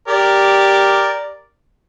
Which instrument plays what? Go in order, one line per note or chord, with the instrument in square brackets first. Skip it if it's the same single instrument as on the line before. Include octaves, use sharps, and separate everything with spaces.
[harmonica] G4 A#4 D5